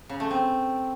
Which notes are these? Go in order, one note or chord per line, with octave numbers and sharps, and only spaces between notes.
C#3
A3
C4